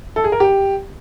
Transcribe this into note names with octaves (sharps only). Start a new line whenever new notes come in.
A4
G#4
A#4
G4